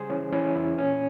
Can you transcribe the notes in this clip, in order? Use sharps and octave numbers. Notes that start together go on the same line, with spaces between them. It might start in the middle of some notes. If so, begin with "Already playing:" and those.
Already playing: C#3 G3 G#4 C5
E3 C#4
E3 C#4
E2 E4
A#2 C#4